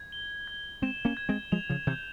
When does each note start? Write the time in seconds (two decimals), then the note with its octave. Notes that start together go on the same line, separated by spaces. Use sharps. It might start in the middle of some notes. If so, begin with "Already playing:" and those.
Already playing: G#6
0.12 G7
0.48 G#6
0.82 G#3 C4 E7
1.05 A#3 C#4
1.17 G#6
1.29 G#3 C4
1.52 F3 G#3 F7
1.70 C#3 F3
1.87 C3 E3 G6